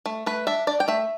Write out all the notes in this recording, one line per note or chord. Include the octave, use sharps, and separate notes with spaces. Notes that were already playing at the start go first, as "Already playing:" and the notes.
A3
A3 B4
D4 E5
D4 D5
G5
A3 E5